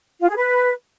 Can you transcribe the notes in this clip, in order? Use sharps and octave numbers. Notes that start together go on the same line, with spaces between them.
F4
G#4
B4